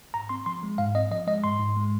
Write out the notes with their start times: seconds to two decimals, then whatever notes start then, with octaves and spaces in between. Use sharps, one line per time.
0.14 G#2 A#5
0.29 C4 C6
0.46 F3 C6
0.63 G#3
0.78 G#2 F5
0.95 C4 D#5
1.11 F3 D#5
1.27 G#3 D#5
1.44 G#2 C6
1.60 G#2
1.77 G#3